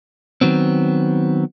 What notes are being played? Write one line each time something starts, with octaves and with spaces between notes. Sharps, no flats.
D#3 F#3 B3 C4